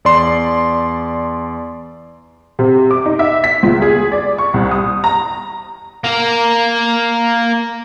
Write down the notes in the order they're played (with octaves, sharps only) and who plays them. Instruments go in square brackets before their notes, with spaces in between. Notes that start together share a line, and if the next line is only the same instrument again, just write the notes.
[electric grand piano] E2 D5 C6
[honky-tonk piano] C3
D6
D#4
E5
B6
C#2
G#4
D5
C#6
C2
D#6
A#5
[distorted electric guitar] A#3 A#4